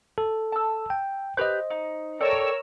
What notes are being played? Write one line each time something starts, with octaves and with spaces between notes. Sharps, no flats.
A4
A5 E6
G5
G4 B4 C5 D#5 G6
D#4
A4 A#4 C#5 D5 G5 E6